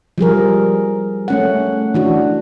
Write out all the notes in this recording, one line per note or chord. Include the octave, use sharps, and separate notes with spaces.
F3 G3 G#4 A#4
A3 C#4 F#5
E3 D4 F#4